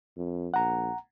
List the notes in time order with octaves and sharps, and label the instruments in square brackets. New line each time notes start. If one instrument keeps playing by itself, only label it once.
[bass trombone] F2
[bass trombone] A#1 [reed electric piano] F#5 A#5